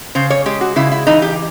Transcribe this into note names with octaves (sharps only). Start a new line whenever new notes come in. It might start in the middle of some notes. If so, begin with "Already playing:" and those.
C#3 C5
C#5
G#3 G4
F#4
C#3 E4
E4
E3 D#4
G4